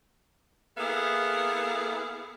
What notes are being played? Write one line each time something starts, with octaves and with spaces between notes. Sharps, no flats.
A#3 B3 E4 G#4 A4 F5